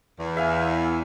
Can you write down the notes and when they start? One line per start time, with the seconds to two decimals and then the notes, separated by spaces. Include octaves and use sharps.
0.19 E2
0.37 E5 F5 G#5